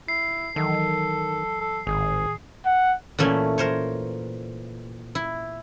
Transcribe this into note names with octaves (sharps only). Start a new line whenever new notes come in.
E4 C7
D#3 E3 F#3 A4 A5
A4
G#1 A2 D#3 G#4
F#5
A#2 E3 A3 C#4
A#4 C5 C#5
E4